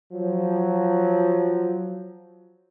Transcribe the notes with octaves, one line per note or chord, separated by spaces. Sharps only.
F3 F#3